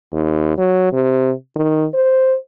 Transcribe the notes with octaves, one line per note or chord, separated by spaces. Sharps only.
D#2
F#3
C3
D#3
C5